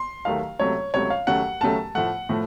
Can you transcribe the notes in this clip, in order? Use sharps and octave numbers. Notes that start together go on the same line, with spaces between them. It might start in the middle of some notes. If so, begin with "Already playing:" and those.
Already playing: C6
D#2 D#3 F#3 A3 F5
C#2 C3 F#3 A3 C#5
C#2 C3 F#3 A3 C#5
F5
D#2 C#3 F#3 A3 F#5
D#2 C#3 F#3 A3 A5
A2 F3 A3 F#5
A2 F3 A3